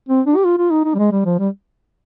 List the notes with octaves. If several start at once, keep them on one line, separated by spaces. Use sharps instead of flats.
C4
D4
G4
F4
F4
D#4
D#4
G3
G#3
G3
F3
G3